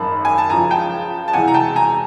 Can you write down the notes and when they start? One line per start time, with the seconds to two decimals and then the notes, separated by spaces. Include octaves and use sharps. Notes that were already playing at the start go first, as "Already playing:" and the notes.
Already playing: G#1 F#2 D#3 A5 B5
0.25 G#5
0.38 A5
0.50 C#2 C#3 F3 G#5 A#5
0.71 G5 A5
1.28 A5
1.33 E1 E2 C3 E3 F#5 G#5
1.48 A#5
1.54 G5 A5
1.76 G#5 A#5